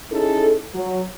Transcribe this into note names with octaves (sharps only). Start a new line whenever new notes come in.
C#4 D#4 E4 G#4 A4
F#3